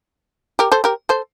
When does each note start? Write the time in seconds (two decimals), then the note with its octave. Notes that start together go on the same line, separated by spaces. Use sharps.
0.59 G4 A#4
0.72 A4 C5
0.84 G4 A#4
1.09 A4 C5